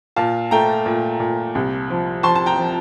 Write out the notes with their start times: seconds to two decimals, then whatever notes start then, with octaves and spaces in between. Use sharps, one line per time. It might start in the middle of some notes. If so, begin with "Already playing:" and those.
0.16 A#2 F5 A5
0.51 A3 G5 A#5
0.86 A#2
1.20 A#2
1.55 C2
1.90 F3
2.23 F3 A5 C6
2.35 A5
2.46 G5 A#5
2.58 F3